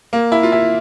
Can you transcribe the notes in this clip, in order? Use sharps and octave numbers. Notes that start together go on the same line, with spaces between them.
A#3
E4
F4
E4